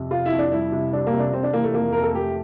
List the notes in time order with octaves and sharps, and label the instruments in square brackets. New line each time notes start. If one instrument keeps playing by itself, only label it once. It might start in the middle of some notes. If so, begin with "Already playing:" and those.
Already playing: [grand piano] F2 C3
[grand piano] F2 [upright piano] F4
[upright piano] E4
[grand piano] F2
[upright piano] D4
[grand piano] G3 [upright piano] E4
[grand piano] C3
[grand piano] G3 [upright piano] D4
[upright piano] A#3
[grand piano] C3
[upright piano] D4
[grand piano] C3 [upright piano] C4
[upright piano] D4
[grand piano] E3 [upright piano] A#3
[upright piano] A3
[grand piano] F2 [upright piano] A#3
[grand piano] F2 [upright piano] A#4
[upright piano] A4
[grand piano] A3 [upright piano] G4